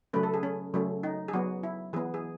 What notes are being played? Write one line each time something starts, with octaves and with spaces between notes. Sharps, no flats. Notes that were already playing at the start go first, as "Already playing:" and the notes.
C#3 F#3 A3 C#4 B4
A4
G#4
C#4
C#3 F#3 A3 C#4
D#4
G#4
F#3 B3 F#4
E4
E3 B3 G#4
G#4